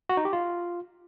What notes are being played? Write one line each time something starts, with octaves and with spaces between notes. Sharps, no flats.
F#4
D#4
G4
F4